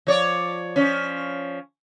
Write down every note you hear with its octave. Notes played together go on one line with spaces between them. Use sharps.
F3 C#5 D5
F3 C#4